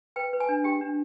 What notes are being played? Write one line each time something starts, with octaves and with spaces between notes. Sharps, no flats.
B4 G5
B4
G#5
D4
G4 G5
D4